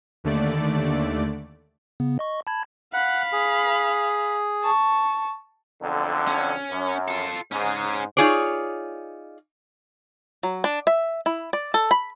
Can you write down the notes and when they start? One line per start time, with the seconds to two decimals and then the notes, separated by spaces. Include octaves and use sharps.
0.24 D#2 D3 A3 D5
2.00 C#3 B3
2.19 D#5 C#6
2.47 A5 B5 G#6
2.93 F5 F#5 B5
3.32 G#4
4.62 A5 C#6
5.82 B1 F2 D3
6.28 C#4
6.71 F#2
7.08 F4 A4
7.52 G#2 C#4 G#4
8.17 D#4 F4 G#4 C#5 D5
10.43 F#3
10.64 D4
10.87 E5
11.26 E4
11.53 D5
11.74 A4
11.91 B5